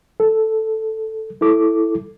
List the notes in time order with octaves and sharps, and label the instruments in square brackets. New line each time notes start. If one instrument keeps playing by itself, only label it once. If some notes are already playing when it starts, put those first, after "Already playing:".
[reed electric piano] A4
E4 A4 D6